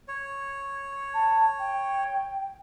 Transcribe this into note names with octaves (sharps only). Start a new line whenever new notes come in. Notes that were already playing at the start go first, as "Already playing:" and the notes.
C#5
A5
G5